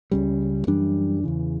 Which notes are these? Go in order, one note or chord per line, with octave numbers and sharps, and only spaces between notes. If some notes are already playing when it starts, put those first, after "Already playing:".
C#2 C#3 G3
F#2 E3 G3 D4
E2 C#3 E3